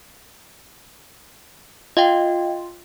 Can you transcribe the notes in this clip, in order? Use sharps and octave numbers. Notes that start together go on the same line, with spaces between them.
F4 D#5 F5 G5